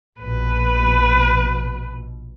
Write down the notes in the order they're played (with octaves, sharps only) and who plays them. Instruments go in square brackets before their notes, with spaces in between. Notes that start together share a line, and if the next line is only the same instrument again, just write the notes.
[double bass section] A#1 B2 [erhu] B4